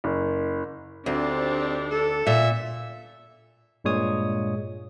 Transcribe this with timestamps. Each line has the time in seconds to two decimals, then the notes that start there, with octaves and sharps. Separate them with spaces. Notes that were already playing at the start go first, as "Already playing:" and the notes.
0.04 F#1
1.06 D2 C4 D4 D#4 G4
1.91 A4
2.27 A#2 E5
3.84 G2 A#2 G#3 C#5 D#6